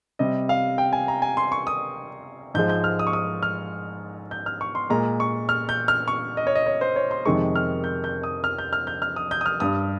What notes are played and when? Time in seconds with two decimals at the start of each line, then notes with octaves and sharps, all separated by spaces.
0.19 C3 G3 D#5
0.49 F5
0.78 G5
0.93 G#5
1.08 A#5
1.22 G#5
1.37 C6
1.52 C#6
1.67 D#6
2.54 G#2 F3 G#3 G6
2.69 G6
2.84 F6
2.99 D#6
3.07 C#6
3.13 D#6
3.43 F6
4.31 G6
4.46 F6
4.61 C#6
4.75 C6
4.90 A#2 G#3 A#5
5.20 C#6
5.49 F6
5.69 G6
5.88 F6
6.08 C#6
6.37 D#5
6.47 C#5
6.55 D#5
6.66 C#5
6.81 C5
6.96 C#5
7.11 C6
7.26 F2 C3 D#3 G#3 C#6
7.56 F6
7.84 G6
8.04 G6
8.24 D#6
8.44 F6
8.58 G6
8.73 F6
8.87 G6
9.02 F6
9.16 D#6
9.31 G6
9.41 D#6
9.46 F6
9.60 G2 G3 D#6